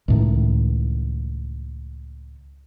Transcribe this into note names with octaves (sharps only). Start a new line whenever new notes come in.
C#2 A2 D#3